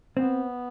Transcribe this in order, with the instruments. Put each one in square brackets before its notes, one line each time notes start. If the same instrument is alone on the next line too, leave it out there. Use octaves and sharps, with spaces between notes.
[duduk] B3 [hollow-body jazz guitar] C4